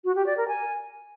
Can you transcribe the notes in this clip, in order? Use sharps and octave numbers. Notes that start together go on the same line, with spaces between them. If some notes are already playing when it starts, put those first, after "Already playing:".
F#4
G4
D5
A#4
G#5